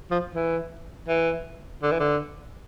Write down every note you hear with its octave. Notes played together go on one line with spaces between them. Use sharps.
F3
E3
E3
D3
E3
D3